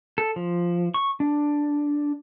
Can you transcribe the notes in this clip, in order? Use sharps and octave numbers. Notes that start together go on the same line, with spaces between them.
A4
F3
C#6
D4